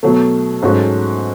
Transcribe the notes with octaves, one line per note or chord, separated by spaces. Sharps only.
B2 F#3 A3
G#2 F#3 A3 C#4 F#4